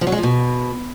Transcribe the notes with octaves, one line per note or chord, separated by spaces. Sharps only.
F3
F#3
G#3
F3
B2